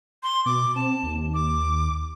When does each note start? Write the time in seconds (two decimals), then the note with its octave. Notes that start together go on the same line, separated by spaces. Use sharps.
0.23 C6
0.46 B2 D6
0.75 C4 A5
1.03 D#2
1.34 D6